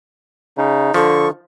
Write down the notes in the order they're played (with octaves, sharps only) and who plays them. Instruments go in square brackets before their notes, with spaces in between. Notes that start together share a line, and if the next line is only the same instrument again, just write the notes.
[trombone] C#3 [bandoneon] D#4
[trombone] D3 [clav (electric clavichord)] F3 [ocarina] A4 [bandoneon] C#6